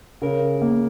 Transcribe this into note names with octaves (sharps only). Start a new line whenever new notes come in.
C#3 A#4
A#3